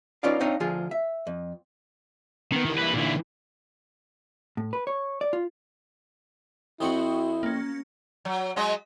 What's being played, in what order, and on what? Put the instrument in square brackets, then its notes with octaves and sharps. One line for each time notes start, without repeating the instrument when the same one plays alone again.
[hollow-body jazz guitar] C#4 D#4 F4 B4 D5 F5
C4 D4 D#4 C#5 D#5 F5
D2 F3 F4 G#4
E5
F2
[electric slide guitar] D#3 [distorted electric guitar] B3 C#4
[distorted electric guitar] E3 A#3
[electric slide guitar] E4 B4
[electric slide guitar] A#2 E4 [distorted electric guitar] D3 E3
[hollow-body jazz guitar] A2
B4
C#5
D5
F4
[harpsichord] F2 F3 C4 [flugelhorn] E4 [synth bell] F#4 C#6 D#6
[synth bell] A#3 C#4
[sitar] F#3
F#3 G#3 D#5